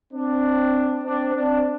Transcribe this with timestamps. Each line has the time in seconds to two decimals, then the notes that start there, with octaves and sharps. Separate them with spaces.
0.13 C4 D4
1.04 C4 D4
1.34 C4 D4